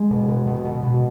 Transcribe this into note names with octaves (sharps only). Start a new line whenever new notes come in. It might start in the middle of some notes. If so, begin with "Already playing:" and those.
Already playing: G#3
B2
B2
B2
B2
B2